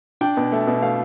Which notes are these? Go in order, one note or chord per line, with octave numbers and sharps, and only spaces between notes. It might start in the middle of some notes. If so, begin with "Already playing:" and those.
D4 G5
B2
A3
B2
A3 F5